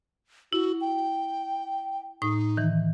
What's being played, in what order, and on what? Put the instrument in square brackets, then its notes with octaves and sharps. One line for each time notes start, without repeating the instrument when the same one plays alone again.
[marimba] E4 [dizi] F#4
[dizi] G5
[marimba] A2 D#6 [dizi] D#4
[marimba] D#3 E3